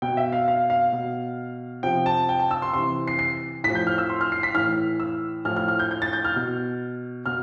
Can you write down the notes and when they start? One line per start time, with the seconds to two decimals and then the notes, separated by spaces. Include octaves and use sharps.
0.02 B2 G5
0.17 E5
0.32 F5
0.48 F5
0.70 F5
0.93 B2
1.83 C3 F3 G5
2.06 A5
2.29 G5
2.39 A5
2.51 E6
2.62 C6
2.73 C3 E3 C6
3.08 C7
3.19 C7
3.64 A2 F3 B6
3.75 G6
3.87 F6
3.98 E6
4.10 C6
4.21 F6
4.32 C7
4.43 B6
4.54 A2 E3 F6
5.00 E6
5.45 A2 F3 F6
5.56 F6
5.68 F6
5.79 G6
5.91 G6
6.02 A6
6.13 G6
6.25 F6
6.36 B2
7.26 B2 F6